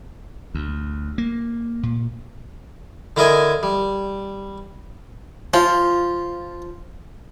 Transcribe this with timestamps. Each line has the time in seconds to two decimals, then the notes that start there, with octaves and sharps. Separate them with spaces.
0.54 D2
1.18 A#3
1.83 A#2
3.17 D3 E4 A#4 D#5 G#5
3.63 G3
5.54 F3 F4